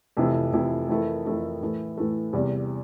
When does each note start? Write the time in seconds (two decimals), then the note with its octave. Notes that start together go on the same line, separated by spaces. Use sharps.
0.17 F2 C3 E3 A3 E4
0.53 F2 C3 E3 A3 E4
0.89 F2 E3 A3 E4 A#4
1.26 F2 E3 A3 E4 A#4
1.61 A2 E3 A3
1.97 A2 E3 A3
2.33 E2 C3 G3